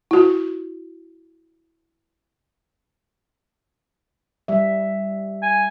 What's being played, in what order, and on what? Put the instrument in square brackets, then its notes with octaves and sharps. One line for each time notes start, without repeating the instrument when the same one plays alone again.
[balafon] E4 F#4
[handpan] G3 E5
[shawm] G#5